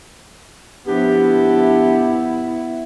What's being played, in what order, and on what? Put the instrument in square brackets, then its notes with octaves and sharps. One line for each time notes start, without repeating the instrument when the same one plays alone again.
[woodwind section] F3 D4 G4 [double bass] B3 E4